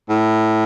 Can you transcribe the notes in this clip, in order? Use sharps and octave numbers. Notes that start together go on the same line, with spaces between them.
A2